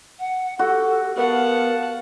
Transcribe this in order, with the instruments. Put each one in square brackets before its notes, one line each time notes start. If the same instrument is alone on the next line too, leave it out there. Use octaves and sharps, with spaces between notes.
[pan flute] F#5
[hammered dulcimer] F#4 [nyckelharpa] G4 [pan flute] A4
[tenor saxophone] B3 [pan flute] A#4 [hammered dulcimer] F5 [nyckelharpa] F#5 A5